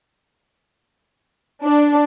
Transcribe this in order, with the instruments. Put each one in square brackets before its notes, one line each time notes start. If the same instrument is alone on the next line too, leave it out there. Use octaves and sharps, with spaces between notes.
[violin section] D4